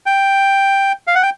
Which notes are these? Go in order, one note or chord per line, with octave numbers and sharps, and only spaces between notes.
G5
F5
F#5
G5